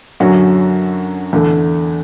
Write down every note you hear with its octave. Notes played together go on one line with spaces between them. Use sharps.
F#2 D3 F#3 C#4 F#4
E2 D3 A3